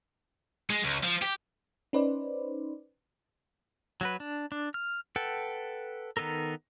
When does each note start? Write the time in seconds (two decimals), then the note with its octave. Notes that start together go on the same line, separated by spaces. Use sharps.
0.70 G#3
0.84 C#2
1.04 F3
1.22 G4
1.93 C#4 D#4 B4 C5 D5
4.01 F#3 F#4 B4
4.20 D4
4.52 D4
4.74 F6
5.16 A4 B4 F#5 G5
6.17 D#3 B3 D#4 A4 A#4